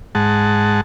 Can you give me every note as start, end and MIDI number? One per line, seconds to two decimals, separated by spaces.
0.15 0.81 44
0.15 0.81 56
0.15 0.81 78
0.15 0.81 81